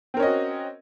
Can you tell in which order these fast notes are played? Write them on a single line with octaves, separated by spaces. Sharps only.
C4 A#4 C#4 D#5 F#4